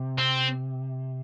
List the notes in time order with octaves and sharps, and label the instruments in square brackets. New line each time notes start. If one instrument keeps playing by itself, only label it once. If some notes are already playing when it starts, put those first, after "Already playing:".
Already playing: [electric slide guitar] C3
[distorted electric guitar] C4